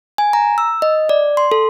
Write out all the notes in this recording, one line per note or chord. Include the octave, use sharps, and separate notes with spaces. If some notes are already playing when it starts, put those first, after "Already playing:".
G#5
A#5
E6
D#5
D5
C6
A4